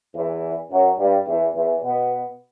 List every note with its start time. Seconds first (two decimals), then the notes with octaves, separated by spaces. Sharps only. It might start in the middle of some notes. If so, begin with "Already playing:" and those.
0.14 E2 E3
0.70 F#2 F#3
0.98 G2 G3
1.26 E2 E3
1.55 E2 E3
1.83 B2 B3